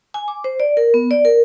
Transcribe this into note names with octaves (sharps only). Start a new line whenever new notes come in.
G#5
D6
C5
D5
A#4
B3
D5
A#4